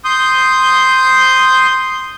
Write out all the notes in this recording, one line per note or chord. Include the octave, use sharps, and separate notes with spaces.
C6 D#6 G6